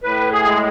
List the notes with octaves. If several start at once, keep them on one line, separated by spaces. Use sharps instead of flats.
A2 B4
G#4
G#3